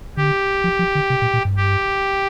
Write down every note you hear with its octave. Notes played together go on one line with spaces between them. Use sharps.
D3 G4
F3
F3
D3
C3
A#2
A#2
G2
G4